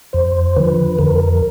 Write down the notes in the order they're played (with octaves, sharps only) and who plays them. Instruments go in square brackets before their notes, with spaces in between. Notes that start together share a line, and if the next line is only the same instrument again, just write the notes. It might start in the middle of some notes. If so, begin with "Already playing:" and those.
[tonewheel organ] F2 C5
D3 F3 B4
F2 A#4
A#4